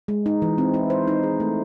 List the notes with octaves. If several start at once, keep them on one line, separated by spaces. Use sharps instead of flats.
G#3
D#4
E3
C4
E4
C5
D#4
G#4
A3